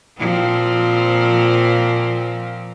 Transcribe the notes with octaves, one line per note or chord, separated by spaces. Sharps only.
A#2 F3 C4